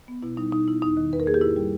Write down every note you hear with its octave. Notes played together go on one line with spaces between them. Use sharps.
B3
B2 E4
G3 D#4
B2 D#4
B3 E4
E2 D#4
D#3
E2 B4
A#4
A#3 G#4
G4
G#2 E4
G3